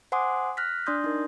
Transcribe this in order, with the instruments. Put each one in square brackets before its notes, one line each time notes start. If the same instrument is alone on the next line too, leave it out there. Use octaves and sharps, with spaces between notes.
[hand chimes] C5 F#5 G#5 C6 D6 D#6
F6 F#6 A#6 B6
D4 D5 C6 D#6 G6 A#6
D#4 A#4